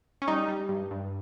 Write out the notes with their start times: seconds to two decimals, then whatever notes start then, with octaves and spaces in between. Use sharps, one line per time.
0.22 C#4
0.28 G3 D#4
0.48 G3
0.69 G2
0.91 G2